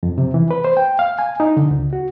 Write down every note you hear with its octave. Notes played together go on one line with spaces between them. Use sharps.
F2
C3
E3
B4
C5
G5
F5
G#5
D#4
D3
C#2
F#4